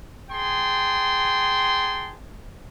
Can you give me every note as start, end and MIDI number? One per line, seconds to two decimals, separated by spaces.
0.30 2.15 68
0.30 2.15 79
0.30 2.15 81
0.30 2.15 84